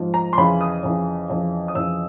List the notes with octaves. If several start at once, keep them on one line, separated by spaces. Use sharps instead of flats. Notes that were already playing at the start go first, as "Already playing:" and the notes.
Already playing: G#2 F3
A#5
C6
F2 C#3 E3 B5
D#6
F2 C#3 E3
F2 C#3 E3
D#6
F2 C#3 E3 E6